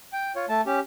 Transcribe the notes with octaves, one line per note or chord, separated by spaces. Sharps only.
G5
F4 C#5
A3 A5
C#4 G4